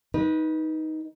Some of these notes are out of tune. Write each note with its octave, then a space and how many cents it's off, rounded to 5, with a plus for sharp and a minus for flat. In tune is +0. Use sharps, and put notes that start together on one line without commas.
D#4 +10 B4 -20